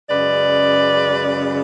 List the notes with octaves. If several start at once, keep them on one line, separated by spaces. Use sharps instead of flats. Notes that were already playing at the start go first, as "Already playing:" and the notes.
F#2 C#3 G#3 B4 D5